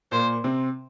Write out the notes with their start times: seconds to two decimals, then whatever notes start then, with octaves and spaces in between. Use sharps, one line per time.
0.12 A#2 A#3 C5
0.44 C3 C4